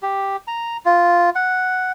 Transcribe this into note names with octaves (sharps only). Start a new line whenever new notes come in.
G4
A#5
F4
F#5